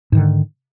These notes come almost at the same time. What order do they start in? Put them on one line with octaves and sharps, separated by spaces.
G#2 D#3 D3